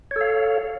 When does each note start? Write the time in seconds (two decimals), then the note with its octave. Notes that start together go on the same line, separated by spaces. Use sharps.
0.11 C#5
0.16 A4
0.21 F5